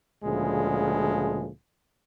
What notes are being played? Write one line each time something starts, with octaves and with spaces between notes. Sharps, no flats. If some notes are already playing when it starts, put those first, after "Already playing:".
D2 A#2 C#3 F3 G#3